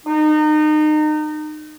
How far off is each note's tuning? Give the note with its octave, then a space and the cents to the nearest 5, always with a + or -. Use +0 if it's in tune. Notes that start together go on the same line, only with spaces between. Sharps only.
D#4 -30